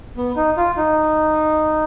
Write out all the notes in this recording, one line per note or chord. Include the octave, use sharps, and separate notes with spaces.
B3
D#4
F4
D#4